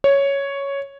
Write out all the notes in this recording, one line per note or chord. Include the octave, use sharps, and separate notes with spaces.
C#5